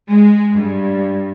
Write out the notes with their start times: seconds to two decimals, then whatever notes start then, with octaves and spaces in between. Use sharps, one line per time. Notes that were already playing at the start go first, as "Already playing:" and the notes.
0.11 G#3
0.60 G2